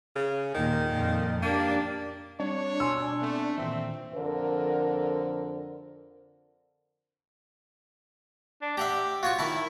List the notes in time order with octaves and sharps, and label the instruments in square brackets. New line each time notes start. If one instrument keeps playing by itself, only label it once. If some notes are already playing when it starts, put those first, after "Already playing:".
[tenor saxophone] C#3
[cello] D#2 A#2 [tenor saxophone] D#3
[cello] F2 A#2
[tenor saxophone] A#3 [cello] D4 G4
[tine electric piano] G3 C4 [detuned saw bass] D4 [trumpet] C#5
[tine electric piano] B2 [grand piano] G#5 C6 E6
[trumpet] A3 [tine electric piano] B3 C4
[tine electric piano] A#2 D#3 E3 [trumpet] C4 [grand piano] E5
[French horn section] F2 D3 A#4 C5
[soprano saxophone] D4
[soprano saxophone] G4 [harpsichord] E5 F#5 A#5
[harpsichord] F4 C#5 C#6 [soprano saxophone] F#4
[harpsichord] D#3 E5 A5 [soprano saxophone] E4